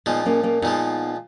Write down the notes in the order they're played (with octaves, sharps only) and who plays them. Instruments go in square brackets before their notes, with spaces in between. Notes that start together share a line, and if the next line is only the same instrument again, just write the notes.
[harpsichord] A#2 F3 G#3 [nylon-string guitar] B3 D#4
[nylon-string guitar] A#3 C#4
A#3 C#4
[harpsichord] A#2 F3 G#3 [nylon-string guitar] B3 D#4